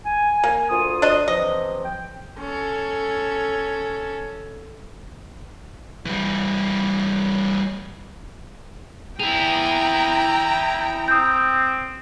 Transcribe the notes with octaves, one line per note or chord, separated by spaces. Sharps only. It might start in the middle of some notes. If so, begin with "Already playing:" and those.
G#5
A#3
D2 F4 D#6
D4 D#5
C3 E3 F3 D#5
G5
C#4 A4
E3 G3
E4 G#4 G5 A#5 F7
C4 D#6 G6